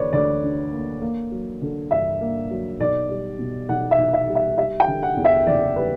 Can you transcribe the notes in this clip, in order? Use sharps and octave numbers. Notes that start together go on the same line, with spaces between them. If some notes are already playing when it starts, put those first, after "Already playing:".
Already playing: D3 A#3 D4 B4 C#5 D5
D2 D5
D4
A#3
A#3
F#3
D3
G2 E5
A#3
F#3
B1 D5
G3
B2
B1 F#5
E5
B1
E5
G3
E5
G3 E5
G5
D3
F#5
E2
E5
F#1 D5
G3 B4